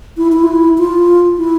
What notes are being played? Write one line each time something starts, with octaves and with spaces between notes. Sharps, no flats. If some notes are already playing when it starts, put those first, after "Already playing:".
E4
E4
F4
E4
F4
E4